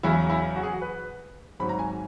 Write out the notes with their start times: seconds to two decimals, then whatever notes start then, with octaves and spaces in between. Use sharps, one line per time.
0.03 E2 C#3 F#3 E4
0.30 E4
0.56 F#4
0.63 G#4
0.73 F#4
0.82 B4
1.60 G#1 G#2 F#3 B5
1.69 A#5
1.79 G#5